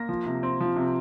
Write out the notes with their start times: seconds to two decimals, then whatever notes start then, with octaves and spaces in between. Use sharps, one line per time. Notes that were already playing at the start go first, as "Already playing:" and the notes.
Already playing: A#3 A#6
0.09 F3
0.26 C3
0.43 C4
0.61 F3
0.76 C3